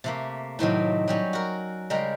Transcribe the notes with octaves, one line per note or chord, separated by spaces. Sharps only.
C3 A3 A#3
A2 C3 D#3 F#3
F#3 G3 C#4
F#4 A#4
C#3 G3 G#3 A#4 A#5